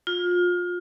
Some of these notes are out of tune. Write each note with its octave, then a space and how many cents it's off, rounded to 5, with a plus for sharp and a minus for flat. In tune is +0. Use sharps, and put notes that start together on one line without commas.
F4 +25